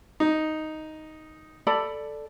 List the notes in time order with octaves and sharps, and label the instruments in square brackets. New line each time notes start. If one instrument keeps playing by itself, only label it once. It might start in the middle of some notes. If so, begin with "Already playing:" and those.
[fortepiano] D#4
[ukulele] A4 D5 B5